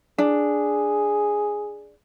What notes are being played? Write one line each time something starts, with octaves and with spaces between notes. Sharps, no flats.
D4 G#4